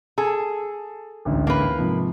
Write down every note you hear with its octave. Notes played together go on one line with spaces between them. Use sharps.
G#4 A4 A5
A1 D2 G#2
A#3 B4
G#2 C3 F3